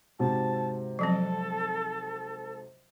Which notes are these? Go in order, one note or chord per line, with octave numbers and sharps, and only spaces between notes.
G#2 C3 F#4 A5
F3 F#3 C4 A4